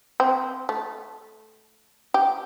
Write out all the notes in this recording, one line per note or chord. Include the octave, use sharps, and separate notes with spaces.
C4
A3
G4